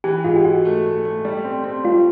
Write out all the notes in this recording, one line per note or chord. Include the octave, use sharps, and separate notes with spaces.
E3 G4
G#2 F4
G4
G#2 F#4
A3
A3
A3
G3
C4
C4
G3 F4